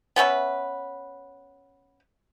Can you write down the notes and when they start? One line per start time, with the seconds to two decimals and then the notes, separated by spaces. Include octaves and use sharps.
0.16 B3 C#4 B4 E5